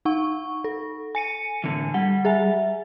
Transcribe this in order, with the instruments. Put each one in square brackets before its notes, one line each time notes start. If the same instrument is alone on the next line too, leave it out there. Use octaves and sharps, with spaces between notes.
[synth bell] D#4 F#5 C#6
A4
G#5 C#7 D#7
[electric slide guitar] A2 D3 E3
[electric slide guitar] G3 [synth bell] F#5
[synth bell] G#4 E5 G#5